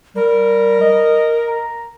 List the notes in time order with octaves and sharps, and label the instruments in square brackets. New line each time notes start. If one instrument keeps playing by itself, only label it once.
[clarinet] G3 [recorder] A#4
[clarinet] D#5
A#5